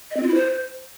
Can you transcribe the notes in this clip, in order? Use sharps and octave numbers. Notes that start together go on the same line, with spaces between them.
D#5
C4
F4
E4
C5